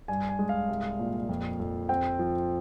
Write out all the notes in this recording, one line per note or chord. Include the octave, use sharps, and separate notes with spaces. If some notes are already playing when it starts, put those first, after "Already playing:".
G2 G#5
G#5
G#3
F5
C2
A#2
F2
F2
C4 G5
F3